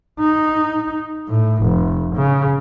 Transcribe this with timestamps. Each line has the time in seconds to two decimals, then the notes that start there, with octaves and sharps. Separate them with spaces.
0.20 D#4
1.28 A2
1.63 F1
2.16 C#3